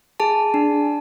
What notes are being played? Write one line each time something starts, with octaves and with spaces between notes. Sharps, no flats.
G#4 A5
D4